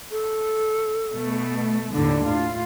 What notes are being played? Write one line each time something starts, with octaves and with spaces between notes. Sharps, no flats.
A4
B2 A3
D#2 A2 D3 D4
A2 F4